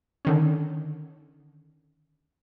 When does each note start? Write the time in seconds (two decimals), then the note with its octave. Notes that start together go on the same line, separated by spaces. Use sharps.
0.25 D3 D#3 C#4